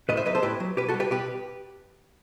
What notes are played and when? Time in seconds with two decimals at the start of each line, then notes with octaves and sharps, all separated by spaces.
0.09 A2 B4 D#5
0.17 C5 E5
0.26 F#3 B4 D#5
0.35 A4 C5
0.42 A2 G4 B4
0.60 F#3
0.77 B2 G4 B4
0.88 F#4 A4
0.94 G3
1.00 G4 B4
1.11 B2 G4 B4